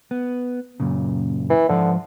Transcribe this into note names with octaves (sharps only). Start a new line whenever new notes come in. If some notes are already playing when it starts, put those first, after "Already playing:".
B3
F#2 A#2 C#3
E3
G#2 D3 F3 C5